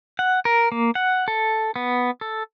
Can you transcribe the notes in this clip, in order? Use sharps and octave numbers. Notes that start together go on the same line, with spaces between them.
F#5
A#4
A#3
F#5
A4
B3
A4